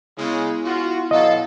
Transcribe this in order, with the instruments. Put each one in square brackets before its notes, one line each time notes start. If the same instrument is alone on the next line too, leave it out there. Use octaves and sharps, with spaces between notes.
[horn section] C#3 G#3 [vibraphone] B3 E4
[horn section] F4 F#4
[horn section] B2 F#3 A4 [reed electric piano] D#5 [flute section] F5